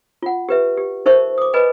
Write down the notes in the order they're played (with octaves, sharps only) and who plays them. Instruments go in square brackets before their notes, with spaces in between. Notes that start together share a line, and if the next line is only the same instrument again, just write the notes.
[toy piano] F4 F#5
G4 B4 E5
G4
D#4 A#4 C5 E5 C#6
D6 D#6
B4 D#5 G#5 B5